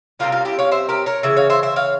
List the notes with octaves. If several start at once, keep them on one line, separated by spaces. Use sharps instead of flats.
C3 G3 A#3 C#4 F4
F4
E4 G4
C#5 F5
C5 E5
G4 A#4
A#4 C#5
C#3 E3 E5
C#5 F5
C5 E5
C5 E5
C#5 F5